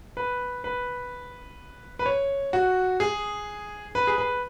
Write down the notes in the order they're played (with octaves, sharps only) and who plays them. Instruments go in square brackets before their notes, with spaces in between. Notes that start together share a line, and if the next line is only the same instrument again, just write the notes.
[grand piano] B4
B4
B4
C#5
F#4
G#4
B4
G#4
B4